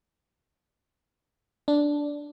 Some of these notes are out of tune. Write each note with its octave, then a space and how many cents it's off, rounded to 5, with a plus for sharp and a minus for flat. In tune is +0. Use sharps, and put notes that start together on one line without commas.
D4 -5